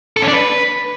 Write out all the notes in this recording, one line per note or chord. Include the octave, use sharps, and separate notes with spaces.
A4
C#4
D4
B4